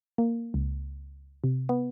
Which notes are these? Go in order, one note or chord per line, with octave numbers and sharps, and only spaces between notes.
A#3
C#2
C3
B3